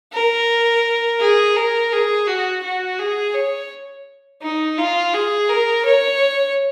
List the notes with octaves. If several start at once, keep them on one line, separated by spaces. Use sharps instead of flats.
A#4
G#4
A#4
G#4
F#4
F#4
G#4
C#5
D#4
F4
G#4
A#4
C#5